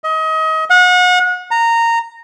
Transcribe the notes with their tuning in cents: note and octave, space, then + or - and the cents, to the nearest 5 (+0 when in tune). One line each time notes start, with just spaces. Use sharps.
D#5 +30
F#5 -35
A#5 -15